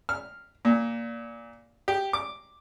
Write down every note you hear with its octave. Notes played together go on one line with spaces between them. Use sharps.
F6
A#2
G4
D6